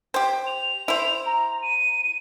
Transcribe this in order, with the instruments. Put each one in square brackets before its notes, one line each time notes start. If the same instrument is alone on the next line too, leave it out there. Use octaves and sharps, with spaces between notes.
[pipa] G4 C5
[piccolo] F7
[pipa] E4 C5
[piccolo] A#5
D#7